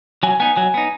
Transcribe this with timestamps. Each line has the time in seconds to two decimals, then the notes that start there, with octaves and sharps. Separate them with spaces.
0.23 F#3 G#5
0.40 B3 D#4 G#5
0.56 F#3 G#5
0.74 B3 D#4